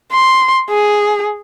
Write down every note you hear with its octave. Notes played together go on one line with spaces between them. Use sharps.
C6
G#4